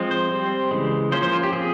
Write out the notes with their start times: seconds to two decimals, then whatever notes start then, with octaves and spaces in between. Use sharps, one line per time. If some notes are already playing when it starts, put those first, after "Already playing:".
Already playing: F3 G#3 C4
0.11 C5
0.31 G3 C4
0.71 C#3 E3 G#3
1.12 F3 A#3 C#4 C5
1.22 C5
1.33 F4
1.43 G4
1.53 F3 C4 G#4